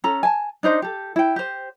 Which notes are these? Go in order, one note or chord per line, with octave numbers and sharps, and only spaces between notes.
C#4 A4 A#5
G#5 A5
D4 D#4 C5 D#5
G4 A4
E4 G5
G4 C5